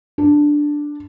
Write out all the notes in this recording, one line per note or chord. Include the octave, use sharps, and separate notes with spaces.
D4